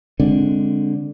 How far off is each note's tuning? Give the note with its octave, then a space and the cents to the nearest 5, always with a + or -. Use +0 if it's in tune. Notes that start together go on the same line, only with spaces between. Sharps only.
D3 +0 G#3 +0 C4 +15